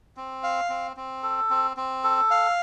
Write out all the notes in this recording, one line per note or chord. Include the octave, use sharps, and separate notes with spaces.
C4
F5
C4
C4
A4
C4
C4
A4
F5